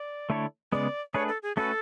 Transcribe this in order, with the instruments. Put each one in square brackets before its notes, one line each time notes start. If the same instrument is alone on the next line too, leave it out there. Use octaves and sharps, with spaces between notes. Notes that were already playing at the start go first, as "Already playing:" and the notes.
Already playing: [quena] D5
[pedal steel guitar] D3 A3 E4 A4 C#5
[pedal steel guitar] C#3 G#3 B3 [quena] D5
[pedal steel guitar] A3 D4 G#4 B4 [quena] C#5
[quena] A4
G#4
[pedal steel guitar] A3 C#4 F#4 B4 [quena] A4